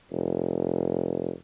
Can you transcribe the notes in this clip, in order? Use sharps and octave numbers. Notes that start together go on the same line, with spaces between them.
F1